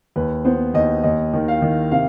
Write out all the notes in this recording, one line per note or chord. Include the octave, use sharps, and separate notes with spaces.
D#2 B4
B3 C5
D#2 D#5
D#2 D#5
D#3
F5
D#3
C3 F5